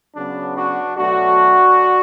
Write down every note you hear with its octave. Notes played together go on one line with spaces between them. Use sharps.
C#3 F#3 B3 D4
D4 F#4
B2 F#3 A3 D4 F#4